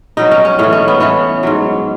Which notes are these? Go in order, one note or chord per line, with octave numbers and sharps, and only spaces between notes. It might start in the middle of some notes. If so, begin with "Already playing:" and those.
B2 F#3 D#4
C#4
C#4
A2 E3 C#4
C#4
B3
A2 E3 C#4
G#2 F#3